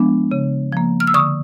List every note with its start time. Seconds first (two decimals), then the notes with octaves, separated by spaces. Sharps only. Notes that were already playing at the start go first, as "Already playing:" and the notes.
Already playing: F3 G#3 B3 D4
0.31 C#3
0.72 F3 A#3
1.00 F6
1.07 E6
1.14 D3 C#6 D#6